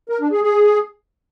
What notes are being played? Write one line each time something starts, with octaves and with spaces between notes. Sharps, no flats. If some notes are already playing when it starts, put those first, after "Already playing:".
A#4
D4
G#4
G#4